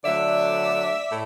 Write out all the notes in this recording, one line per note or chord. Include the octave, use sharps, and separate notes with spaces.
D3 F#3 A3 D5 E5
A2